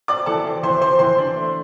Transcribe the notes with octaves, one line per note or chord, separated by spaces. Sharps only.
C4 D5 D6
E3 A4 A5
C4
E3 C5 C6
C4 C5 C6
E3 C5 C6
D4
A3